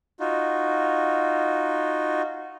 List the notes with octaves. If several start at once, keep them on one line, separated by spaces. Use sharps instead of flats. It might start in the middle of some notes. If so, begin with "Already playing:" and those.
D#4 F4 F#4